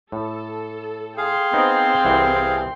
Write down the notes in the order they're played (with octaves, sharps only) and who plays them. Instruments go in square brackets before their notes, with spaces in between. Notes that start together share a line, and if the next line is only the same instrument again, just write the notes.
[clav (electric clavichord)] A2 [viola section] A4
[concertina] G#4 F5 [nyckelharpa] G5 C6
[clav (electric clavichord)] B3 D#4 [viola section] C4
[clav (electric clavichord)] C2 E3 F#5